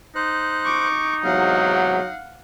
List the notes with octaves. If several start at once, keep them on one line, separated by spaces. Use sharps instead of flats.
D#4 C5 F#6
C#6 D6
E2 G#2 C3 F#3 F5 F#5